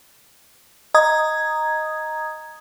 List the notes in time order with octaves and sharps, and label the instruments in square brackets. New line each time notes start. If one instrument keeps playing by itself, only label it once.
[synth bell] D#5 A#5 D#6 G#6